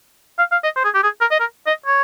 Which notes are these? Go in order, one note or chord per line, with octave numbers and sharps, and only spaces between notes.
F5
F5
D#5
C5
G#4
G4
G#4
A#4
D#5
A#4
D#5
C#5